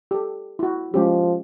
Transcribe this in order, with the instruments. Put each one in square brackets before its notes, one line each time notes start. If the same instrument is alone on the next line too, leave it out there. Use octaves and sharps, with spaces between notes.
[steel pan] G4 A4
E4 F#4
[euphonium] F3 [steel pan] G#3 C#4 G4